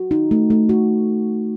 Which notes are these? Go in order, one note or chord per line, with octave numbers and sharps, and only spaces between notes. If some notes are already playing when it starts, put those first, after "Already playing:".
Already playing: F#4
D#4
A3
A3
F#4